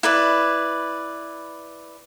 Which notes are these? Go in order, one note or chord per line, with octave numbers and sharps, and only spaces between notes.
E4 B4 D5